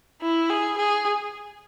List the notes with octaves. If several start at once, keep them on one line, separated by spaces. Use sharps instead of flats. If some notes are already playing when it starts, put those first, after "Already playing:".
E4
G#4
G#4